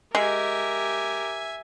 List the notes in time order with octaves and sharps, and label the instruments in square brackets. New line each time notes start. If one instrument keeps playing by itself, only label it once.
[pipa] G#3 [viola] G4 A#4 [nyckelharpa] E5 G#5